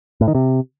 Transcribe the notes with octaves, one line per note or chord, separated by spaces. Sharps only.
A2
D#3
C3